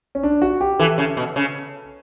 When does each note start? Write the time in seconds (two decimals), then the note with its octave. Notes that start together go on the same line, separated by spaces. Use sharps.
0.15 C#4
0.23 D4
0.42 F#4
0.61 G4
0.79 E3 A4
0.98 C#3
1.17 B2
1.36 C#3